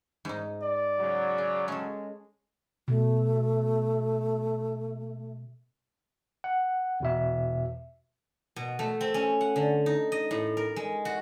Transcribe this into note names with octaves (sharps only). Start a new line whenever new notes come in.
G#2 D#4
D5
C#3 F#3
G#4
G#3 C#4 A4
B2 A3
F#5
E2 B2 E5
B2
A3
C4
C#4
F#5
D3
D#4
D#5
A2
A#4
G#3
F#4